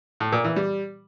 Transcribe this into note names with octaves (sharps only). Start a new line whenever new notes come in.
A2
A#2
E3
G3